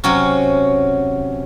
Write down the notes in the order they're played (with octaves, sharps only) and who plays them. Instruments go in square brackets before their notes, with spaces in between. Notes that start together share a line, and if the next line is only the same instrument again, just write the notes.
[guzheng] C3 F#3 C#4